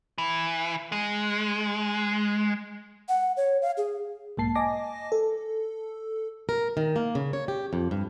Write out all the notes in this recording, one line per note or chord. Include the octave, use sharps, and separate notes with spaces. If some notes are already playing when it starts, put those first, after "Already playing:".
E3
G#3
F#5
C#5
F5
G#4
B1 G#2 A#3 A5 C7
D#5 G#5 A5 D6 A#6
A4
A#4
D#3
A#3
C#3
C#5
G4
F2
G2